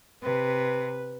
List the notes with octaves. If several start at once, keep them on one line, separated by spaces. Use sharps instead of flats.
C3 B4